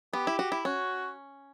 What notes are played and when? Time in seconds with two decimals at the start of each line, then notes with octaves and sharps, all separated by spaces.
0.13 B3 G4
0.27 E4
0.39 F#4
0.52 E4
0.65 C#4 F#4